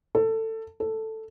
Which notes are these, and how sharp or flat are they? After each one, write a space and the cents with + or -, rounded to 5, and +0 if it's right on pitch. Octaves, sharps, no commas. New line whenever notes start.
A4 +20
A4 +5